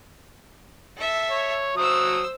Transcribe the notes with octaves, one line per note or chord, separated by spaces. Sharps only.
A4 E5
C#5
F#3 C5 D#6 E6